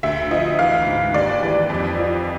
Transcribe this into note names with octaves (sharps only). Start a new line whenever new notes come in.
D2 E5
F3 D#5
E3 F5
G#2
D#2 D5
E3
F2
F3